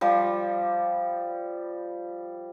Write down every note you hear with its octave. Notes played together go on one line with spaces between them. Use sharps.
F3 G3